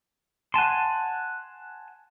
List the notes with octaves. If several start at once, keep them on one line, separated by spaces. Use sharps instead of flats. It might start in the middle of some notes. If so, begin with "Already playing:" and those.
F#5 G#5 A5 C6